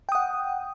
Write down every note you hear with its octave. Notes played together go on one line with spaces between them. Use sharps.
F#5 G5 D#6